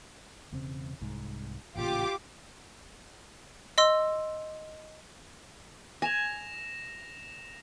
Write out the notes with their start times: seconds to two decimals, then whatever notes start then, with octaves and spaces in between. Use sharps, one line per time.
0.52 E1 C#3 C4
1.01 C2 G#2
1.76 A1 A#2 C#3 F4 G4 D6
3.78 D#5 C6 E6
6.02 G#5 A#6 E7 F7